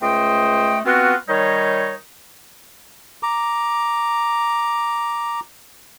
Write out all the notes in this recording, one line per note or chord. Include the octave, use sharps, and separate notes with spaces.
C#2 A3 C5 D#5 G5
B3 C4 F4 F#4
D#3 G3 D#4 C#5
A#5 D6